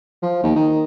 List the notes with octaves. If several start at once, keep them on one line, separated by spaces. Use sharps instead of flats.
F3
D#2
D#3